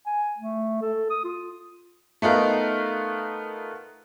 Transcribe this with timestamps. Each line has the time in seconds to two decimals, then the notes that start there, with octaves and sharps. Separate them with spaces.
0.06 G#5
0.38 A3
0.82 A4
1.10 D#6
1.24 F4
2.22 A3 B3 D#4 F4 A#4